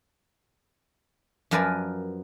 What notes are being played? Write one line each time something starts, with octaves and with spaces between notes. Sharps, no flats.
F#2 F3 A#4 B4 D5 G#5